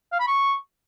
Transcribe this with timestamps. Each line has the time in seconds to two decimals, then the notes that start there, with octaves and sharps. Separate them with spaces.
0.12 F5
0.20 B5
0.27 C#6